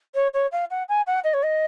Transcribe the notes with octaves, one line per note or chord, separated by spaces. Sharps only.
C#5
C#5
F5
F#5
G#5
F#5
D#5
C#5
D#5